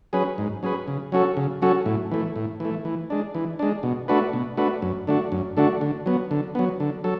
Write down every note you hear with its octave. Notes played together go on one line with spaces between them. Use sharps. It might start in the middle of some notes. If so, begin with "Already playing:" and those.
F#3 C#4 G#4 B4
G#2
F#3 C#4 G#4 B4
C#3
F#3 C#4 F#4 A4
C#3
F#3 C#4 F#4 A4
A2
E3 A3
A2
E3 A3
E3
G#3 D4
E3
G#3 D4
B2
A3 D4 F#4 B4
B2
A3 D4 F#4 B4
F#2
D3 A3 D4 F#4
F#2
D3 A3 D4 F#4
D3
F#3 B3
D3
F#3 B3
D3
F#3 A4